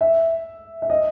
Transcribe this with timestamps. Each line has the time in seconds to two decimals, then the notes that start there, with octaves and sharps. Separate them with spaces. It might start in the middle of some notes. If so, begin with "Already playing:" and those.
0.01 E5
0.82 E5
0.90 D#5